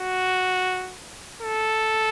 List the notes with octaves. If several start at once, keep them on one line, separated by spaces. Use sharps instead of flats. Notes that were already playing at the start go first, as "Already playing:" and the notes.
Already playing: F#4
A4